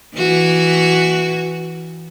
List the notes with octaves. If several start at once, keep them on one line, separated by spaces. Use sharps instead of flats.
E3 F#4